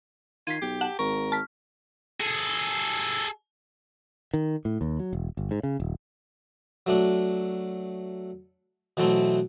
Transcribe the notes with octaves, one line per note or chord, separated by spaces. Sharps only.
D#3 F4 G#6 B6 C7 D#7
B1 G4
F#5 A5
G#1 A#4 C#6
A5 F6 B6
G#4 A4
D#3
A2
D#2
F#3
E1
G1
G#2
C#3
D#1
F#3 A3 D4
B2 E3 F#3 A3 C4